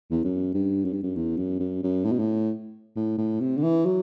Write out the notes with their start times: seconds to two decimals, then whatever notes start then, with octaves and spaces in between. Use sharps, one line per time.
0.11 E2
0.25 F#2
0.54 G2
0.85 F#2
0.93 G2
1.03 F#2
1.16 E2
1.37 F#2
1.60 F#2
1.83 F#2
2.05 A2
2.12 B2
2.19 A2
2.96 A2
3.18 A2
3.41 C3
3.57 D3
3.63 E3
3.86 F#3